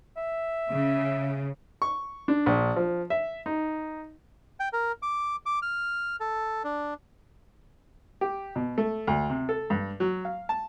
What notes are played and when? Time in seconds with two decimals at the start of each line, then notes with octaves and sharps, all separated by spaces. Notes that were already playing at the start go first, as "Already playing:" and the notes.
0.17 E5
0.70 C#3
1.82 C#6
2.28 D4
2.46 A#1
2.76 F3
3.10 E5
3.46 D#4
4.60 G5
4.73 A#4
5.02 D6
5.46 D6
5.62 F6
6.20 A4
6.64 D4
8.21 G4
8.56 B2
8.78 A3
9.07 D2
9.30 C3
9.49 A4
9.70 G2
10.00 F#3
10.25 F5
10.49 A5